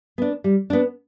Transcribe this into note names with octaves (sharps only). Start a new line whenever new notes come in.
B3 D4
G3
B3 D4